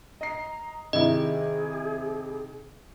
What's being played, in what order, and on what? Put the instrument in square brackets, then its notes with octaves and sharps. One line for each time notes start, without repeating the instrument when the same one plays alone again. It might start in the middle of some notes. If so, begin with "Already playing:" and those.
[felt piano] D#5 C7 [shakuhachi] A#5
[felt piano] C3 D#3 E4 [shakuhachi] G#4 [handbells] D#5